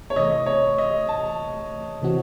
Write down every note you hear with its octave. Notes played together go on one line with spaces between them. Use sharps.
C#5
C3 E3 A3 D#5
C#5
D#5
A5
C3 E3 C4 F#4